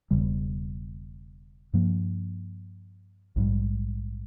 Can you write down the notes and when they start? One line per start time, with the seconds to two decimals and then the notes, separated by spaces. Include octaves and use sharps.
0.11 E1 E2 C#3 G3
1.73 G2 F3 A#3
3.36 A#1 G#2 G3